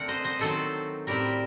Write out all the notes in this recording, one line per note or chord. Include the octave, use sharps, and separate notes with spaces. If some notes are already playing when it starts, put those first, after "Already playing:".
Already playing: D3 A3 C4 A#4 F#5
C5 D#5
C5 D#5
D#3 F#3 C4 A4 C5
A2 G3 C4 G4 A#4